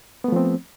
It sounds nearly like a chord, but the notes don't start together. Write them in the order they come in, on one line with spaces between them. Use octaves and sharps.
B3 A3 F3 C4